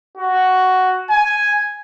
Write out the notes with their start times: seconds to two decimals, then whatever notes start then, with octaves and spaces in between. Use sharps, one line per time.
0.17 F#4
1.10 G#5